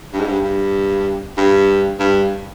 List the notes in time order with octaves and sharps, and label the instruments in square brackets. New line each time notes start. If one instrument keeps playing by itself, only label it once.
[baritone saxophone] G2
G#2
G2
G2
G2
G2